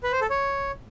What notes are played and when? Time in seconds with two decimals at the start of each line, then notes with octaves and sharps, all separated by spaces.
0.03 B4
0.12 C5
0.21 A4
0.30 C#5